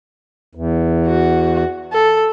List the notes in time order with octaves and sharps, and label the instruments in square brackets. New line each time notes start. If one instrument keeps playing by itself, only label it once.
[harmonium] E2
[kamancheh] F#4
A4